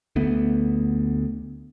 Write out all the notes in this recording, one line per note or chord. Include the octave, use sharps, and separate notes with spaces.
D2 A3 B3